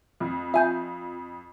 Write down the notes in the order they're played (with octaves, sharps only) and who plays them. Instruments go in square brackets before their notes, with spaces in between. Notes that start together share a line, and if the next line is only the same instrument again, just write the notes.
[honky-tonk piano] F2
[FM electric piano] F4 [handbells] E5 G#5 G6